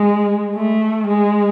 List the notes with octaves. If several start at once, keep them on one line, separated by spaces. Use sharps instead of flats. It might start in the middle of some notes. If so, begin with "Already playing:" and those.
Already playing: G#3
A3
G#3